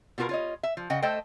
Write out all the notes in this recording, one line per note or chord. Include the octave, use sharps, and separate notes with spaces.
B2 B3 F4 A4 A#4
F4 C#5 D#5
E5
F3
C#3 D#5 F#5 G5
A3 A4 C5 D#5 G5